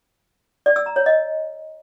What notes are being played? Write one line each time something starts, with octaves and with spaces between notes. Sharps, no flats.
D5
E6
A#5
C#5
D#5